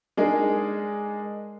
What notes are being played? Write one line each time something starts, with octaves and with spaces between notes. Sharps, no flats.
G#3 D4 D#4 G#4 A#4